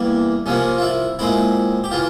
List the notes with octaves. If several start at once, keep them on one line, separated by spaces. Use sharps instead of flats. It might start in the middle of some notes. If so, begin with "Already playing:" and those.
Already playing: E2 E3 G3 A#3
C2 C3 F3 A#3 C#4
F4
E4
A#2 G#3 C4 E4
G4
C#3 E3 F4